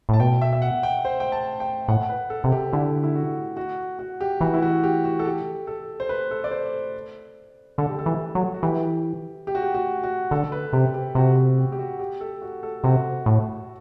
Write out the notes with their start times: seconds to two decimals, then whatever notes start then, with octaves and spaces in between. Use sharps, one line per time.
0.09 A2 A5
0.20 B2 G5
0.42 E5
0.53 E5
0.62 F#5
0.83 G5
1.05 C5
1.20 G5
1.32 A5
1.60 G5
1.88 A2 F#5
2.09 B4
2.30 A4
2.43 C3 A4
2.52 G4
2.73 D3 E4
3.03 E4
3.15 F#4
3.57 F#4
3.99 F#4
4.21 G4
4.41 E3 F#4
4.54 E4
4.62 F#4
4.83 G4
5.05 F#4
5.19 A4
5.25 G4
5.67 A4
6.00 C5
6.09 B4
6.31 A4
6.44 D5
6.51 C5
7.78 D3 A4
7.89 G4
7.99 A4
8.06 E3
8.35 F#3
8.54 F#4
8.63 E3 G4
9.47 G4
9.55 F#4
9.62 G4
9.74 F#4
10.04 F#4
10.31 D3 A4
10.52 B4
10.73 C3 G4
10.94 G4
11.15 C3 F#4
11.36 F#4
11.58 G4
11.72 G4
11.79 F#4
11.99 G4
12.21 A4
12.42 F#4
12.63 A4
12.84 C3 F#4
13.26 A2